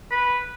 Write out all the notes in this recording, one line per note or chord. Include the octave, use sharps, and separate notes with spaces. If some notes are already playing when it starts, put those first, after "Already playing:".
B4